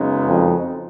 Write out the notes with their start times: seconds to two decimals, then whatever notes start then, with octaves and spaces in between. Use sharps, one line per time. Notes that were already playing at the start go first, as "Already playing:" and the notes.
Already playing: F#2 C#3 G#3 B3 D#4
0.27 F2